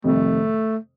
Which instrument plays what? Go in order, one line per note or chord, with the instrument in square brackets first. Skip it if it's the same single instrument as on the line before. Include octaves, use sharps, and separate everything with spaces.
[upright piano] F2 C3 D#3 G3 [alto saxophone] A3